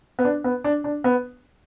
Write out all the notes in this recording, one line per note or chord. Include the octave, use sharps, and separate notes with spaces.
B3
D4
B3
D4
D4
B3